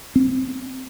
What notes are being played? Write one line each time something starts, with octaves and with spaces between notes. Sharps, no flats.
C4